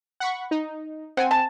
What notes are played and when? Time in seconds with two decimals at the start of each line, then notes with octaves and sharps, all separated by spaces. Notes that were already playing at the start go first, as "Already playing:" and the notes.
0.20 F#5 B5 C#6
0.51 D#4
1.17 C4 F#5 G#5
1.31 A5